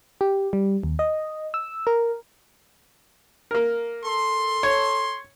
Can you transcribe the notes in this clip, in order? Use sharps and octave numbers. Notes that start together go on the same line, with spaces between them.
G4
G3
D#2
D#5
E6
A#4
A#3 A#4
A4 C6
C#5